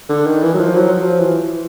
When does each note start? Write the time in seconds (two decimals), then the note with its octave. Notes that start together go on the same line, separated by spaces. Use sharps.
0.09 D3
0.26 D#3
0.43 E3
0.54 F#3
0.60 F3
0.77 F#3
0.94 F3
1.19 E3